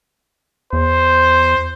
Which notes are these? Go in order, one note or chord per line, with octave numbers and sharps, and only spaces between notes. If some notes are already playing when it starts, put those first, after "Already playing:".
E2 C5